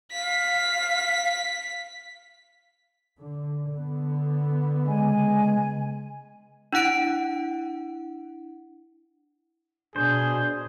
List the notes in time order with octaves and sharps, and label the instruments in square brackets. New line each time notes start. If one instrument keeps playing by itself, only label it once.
[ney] F5 [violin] B6
[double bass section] D3
D3 B3
[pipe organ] C#3 G#3 [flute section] G#5
[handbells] D4 E4 F#5 D7
[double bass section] B2 [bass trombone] D4 [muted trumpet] G#4 [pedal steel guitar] C5